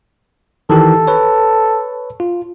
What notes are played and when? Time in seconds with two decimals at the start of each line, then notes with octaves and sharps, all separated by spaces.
0.70 D#3 E3 G4 A4
1.08 B4 C#5
2.20 F4